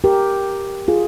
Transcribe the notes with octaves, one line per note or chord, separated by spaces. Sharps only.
G4 A#4
F4 G#4